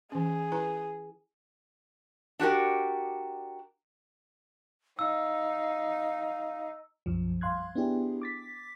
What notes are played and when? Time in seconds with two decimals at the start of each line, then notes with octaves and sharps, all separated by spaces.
0.12 E3 C#4 G#4
0.52 E4 B4 A#5
2.39 D4 F#4 G4 A#4
4.99 D#4 F5 E6
7.06 B1 F#2 F3
7.41 G2 F5 C6 F#6 G#6
7.75 B3 D4 E4 G4 G#4
8.22 D6 A6 B6